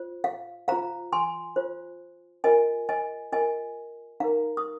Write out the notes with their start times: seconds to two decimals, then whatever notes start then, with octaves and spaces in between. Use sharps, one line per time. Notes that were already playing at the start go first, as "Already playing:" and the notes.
Already playing: F4 C5
0.24 F5
0.68 F4 C5 F5 A#5
1.13 G#5 C6
1.56 F4 C5
2.44 F4 A#4 D#5 G#5
2.89 D#5 G#5
3.32 F4 A#4 D#5 G#5
4.20 D#4 A#4 F5 A#5
4.57 D#6